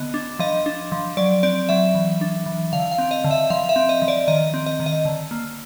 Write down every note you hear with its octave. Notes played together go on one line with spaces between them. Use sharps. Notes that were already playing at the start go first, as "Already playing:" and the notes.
Already playing: D3 B3 D#5
D4
F3 D#5
D4
F3
F#3 D5
C4 D5
F#3 E5
E3
D4
E3
D3 F5
F5
C4
D#5
D3
E5
F3 F5
E5
C4
D#5
F3
D5
D#3 D#5
C4
D#5
D#3
D#5
D3
A#3